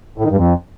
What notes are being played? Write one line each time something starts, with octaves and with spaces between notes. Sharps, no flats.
A2
D#3
G2
F2